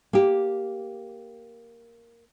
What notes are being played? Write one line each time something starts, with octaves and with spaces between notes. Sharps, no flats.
A#3 G4